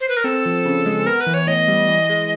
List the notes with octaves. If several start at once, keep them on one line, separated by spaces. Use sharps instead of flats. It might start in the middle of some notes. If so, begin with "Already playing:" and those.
C5
B4
A#4
C4 A4
F3
C#3
G#3
B3 A#4
B4
E3
C#5
A2 D#5
G3
E3
G#3